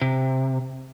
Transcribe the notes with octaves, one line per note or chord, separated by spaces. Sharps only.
C3